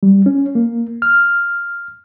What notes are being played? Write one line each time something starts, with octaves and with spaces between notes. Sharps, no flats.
G3
C#4
A#3
F6